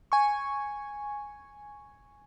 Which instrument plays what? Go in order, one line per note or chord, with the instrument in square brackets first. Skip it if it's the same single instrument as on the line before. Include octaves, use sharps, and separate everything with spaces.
[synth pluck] G#5 C#6